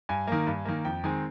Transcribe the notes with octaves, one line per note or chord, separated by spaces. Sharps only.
G2 G#5
D#3 A#3
G2
D#3 A#3
F2 G5
D#3 G#3 C4 G#5